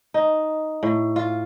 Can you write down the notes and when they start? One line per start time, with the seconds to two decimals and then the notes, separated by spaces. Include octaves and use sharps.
0.14 D#4
0.83 A2
1.16 F4